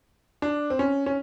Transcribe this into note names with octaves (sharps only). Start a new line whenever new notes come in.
D4
C4
C#4
C#4